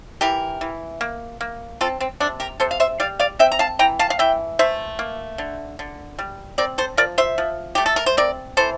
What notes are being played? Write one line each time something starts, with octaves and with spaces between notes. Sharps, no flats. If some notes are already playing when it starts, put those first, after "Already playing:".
E3 G4 A#4
E3
A#3
A#3
C4 F4 A4
C4
C3 D4
G4 A#4
C3 A4 C5
F5
C5 E5
G3 D5 F5
D5 F5
C4 E5 G5
A#5
F5 A5
E3 G5 A#5
F5 A5
F5
E3 E5 G5
A3 C5 E5
A#3
D3
D3
G3
C4 A#4 D5
A4 C5
F3 A#4 D5
C5 E5
F3
A3 G4
A4
A#4
C5
C4 A#4 D5
E3 A4 C5